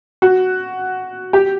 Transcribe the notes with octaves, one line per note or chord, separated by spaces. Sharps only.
F#4
G4